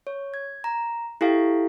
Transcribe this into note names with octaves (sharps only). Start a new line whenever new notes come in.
C#5
G#6
A#5
E4 G4 A4 F5 G5